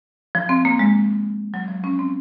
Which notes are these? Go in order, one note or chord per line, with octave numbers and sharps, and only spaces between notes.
F3
C4
A#3
G#3
F#3
F3
C#4
C4